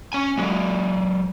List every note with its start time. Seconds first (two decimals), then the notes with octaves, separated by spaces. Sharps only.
0.13 C#4 G#5
0.38 F#3 G#3